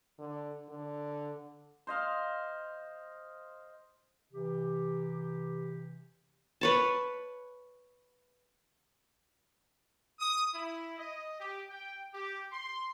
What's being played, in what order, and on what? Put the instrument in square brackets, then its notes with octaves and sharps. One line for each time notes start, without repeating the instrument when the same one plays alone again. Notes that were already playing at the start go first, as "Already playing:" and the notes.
[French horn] D3
D3
[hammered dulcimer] C5 D#5 F5
[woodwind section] C3 E3 G4
[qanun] B4 C#5 A5
[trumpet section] D#6
E4
D#5
G4
G5
G4
C6